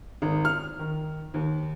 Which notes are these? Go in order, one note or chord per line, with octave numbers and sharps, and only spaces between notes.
G#1
F6
D#3
D#2